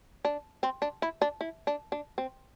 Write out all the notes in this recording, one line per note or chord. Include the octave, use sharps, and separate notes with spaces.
D4
C4
D4
E4
D4
E4
D4
D4
C4